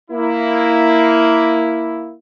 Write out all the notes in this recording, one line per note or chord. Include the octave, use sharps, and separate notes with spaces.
A#3 E4